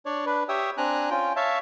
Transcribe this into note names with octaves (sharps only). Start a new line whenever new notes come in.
D4 C#5 D5
D4 B4
G4 C#5 E5 G5 D#6 E6
C4 D4 G#5 A#5 F#6
C#4 F4 G5
C#5 E5 F5 A5